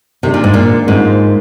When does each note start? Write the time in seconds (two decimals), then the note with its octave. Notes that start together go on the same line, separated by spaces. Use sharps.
0.23 C3 D#3 G#3 D4
0.34 A#2
0.44 G#2
0.54 A#2
0.87 G#2 A#3 F4 G#4 C5